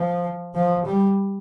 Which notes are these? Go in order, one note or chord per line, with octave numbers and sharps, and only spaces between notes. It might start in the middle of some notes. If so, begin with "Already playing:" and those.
Already playing: F3
F3
G3